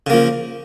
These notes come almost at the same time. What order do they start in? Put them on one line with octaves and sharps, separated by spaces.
C#3 A#3 F3